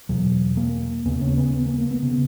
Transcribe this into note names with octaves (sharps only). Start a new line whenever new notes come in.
E2 B2 F#3
A#3
D#2 C#3 B3
C#4
B3
B3
A#3
A#3
B3
C#3